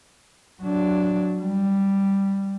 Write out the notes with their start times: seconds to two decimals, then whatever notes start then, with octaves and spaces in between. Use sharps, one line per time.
0.62 F#3 D4
1.41 G3